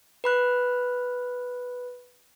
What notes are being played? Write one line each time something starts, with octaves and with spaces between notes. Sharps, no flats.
B4 B5 F#6